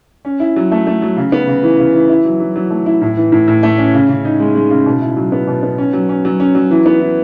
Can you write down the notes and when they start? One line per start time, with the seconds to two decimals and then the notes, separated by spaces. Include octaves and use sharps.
0.25 C#4
0.40 E4
0.56 F#3
0.71 A3
0.87 A3
1.02 F#3
1.17 C#3
1.32 B3
1.47 C#3
1.63 E3
1.79 C#3
1.95 E3
2.09 E4
2.25 F#3
2.40 F#3
2.56 F#3
2.70 A3
2.86 E4
3.02 A2
3.17 E3
3.32 A2
3.48 A2
3.63 A3
3.78 C#4
3.94 C#3
4.09 C#3
4.25 D#4
4.40 G#3
4.55 G#3
4.70 C#3
4.86 B2
5.02 E4
5.17 F#3
5.32 B3
5.47 B2
5.63 B3
5.78 C#4
5.93 F#3
6.09 C#4
6.25 F#3
6.40 C#4
6.55 F#3
6.71 E3
6.86 B3
7.01 E3